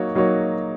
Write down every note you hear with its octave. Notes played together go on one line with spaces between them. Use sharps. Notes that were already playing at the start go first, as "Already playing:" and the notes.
Already playing: F#3 A#3 D#4 F#4 C#5
F#3 A#3 D#4 F#4 C#5